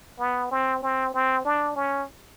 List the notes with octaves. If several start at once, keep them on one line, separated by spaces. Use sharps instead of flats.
B3
C4
C4
C4
D4
C#4